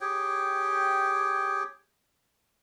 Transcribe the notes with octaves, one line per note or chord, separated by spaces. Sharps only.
G4 G#4 C#5 G5